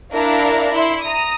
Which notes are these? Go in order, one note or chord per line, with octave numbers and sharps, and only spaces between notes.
D4 E4 A#4 F5
E4 C6
A#5 D#6